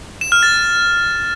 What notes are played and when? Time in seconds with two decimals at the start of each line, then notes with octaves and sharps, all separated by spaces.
0.21 E7
0.32 F6
0.43 A6